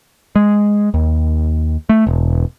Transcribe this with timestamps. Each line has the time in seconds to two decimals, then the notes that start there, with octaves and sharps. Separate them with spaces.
0.36 G#3
0.94 D#2
1.89 A3
2.07 E1